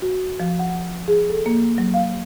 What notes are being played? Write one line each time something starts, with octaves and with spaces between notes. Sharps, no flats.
F#4
F3
F#5
G#4
A4
A#3
F#3
F5